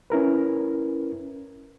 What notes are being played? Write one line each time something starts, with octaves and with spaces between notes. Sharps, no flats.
C#4 E4 A#4 B4